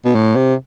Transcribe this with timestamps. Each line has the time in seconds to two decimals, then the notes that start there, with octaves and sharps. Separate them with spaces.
0.05 B2
0.15 A2
0.36 C3